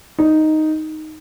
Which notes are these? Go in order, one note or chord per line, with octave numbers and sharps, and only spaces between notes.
D#4